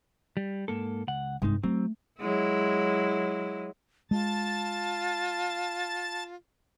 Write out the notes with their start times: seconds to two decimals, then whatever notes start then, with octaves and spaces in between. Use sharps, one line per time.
0.37 G3
0.68 G#2 A#3 A4
1.08 C#2 F#5
1.42 G2 C3 G#3 D#4 E4
1.63 F#3 A3 C4
2.20 F#3 G#3 E4
4.11 G#3 F4 A5 A6